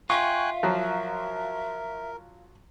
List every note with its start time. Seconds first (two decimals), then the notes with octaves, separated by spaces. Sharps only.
0.10 F4 E5 G5 G#5 C#6 F#6
0.63 F3 F#3 A#4